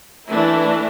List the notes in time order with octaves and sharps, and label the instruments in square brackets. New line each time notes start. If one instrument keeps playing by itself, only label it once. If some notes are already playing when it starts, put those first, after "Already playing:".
[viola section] E3 A3 D4 E4